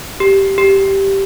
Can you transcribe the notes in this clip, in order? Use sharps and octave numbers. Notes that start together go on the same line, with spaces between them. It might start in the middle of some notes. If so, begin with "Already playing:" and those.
G4
G4